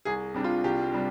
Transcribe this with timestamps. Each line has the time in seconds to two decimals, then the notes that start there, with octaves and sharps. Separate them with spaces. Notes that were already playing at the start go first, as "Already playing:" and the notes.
0.05 C2 G#4
0.34 C3 G3 D4
0.44 F4
0.64 C2 G4
0.92 C3 G3 D4